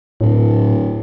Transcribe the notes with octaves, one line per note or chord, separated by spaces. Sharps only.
D1 A2